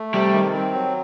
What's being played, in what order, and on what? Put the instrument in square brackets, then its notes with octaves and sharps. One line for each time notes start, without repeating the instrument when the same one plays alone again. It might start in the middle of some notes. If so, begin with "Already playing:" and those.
Already playing: [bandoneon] A3
[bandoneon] C3 [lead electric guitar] G3
[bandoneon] D#3
C4
F#3